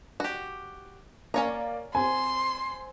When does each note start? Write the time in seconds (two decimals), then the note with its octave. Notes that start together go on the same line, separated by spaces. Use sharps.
0.20 F#4 G4
1.34 A#3 C#4 C#5 D5 A#5
1.95 C4 G#5 C6